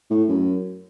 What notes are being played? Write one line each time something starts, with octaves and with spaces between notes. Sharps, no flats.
A2
F#2